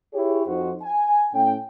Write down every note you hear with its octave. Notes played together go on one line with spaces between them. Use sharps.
E4 G4 G#4 C#5
F2 F3 D#4 F#4 C5
G#5
A2 A3 C#4 A4 G5